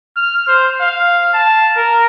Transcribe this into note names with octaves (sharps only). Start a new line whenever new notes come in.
F6
C5
F5
A5
A#4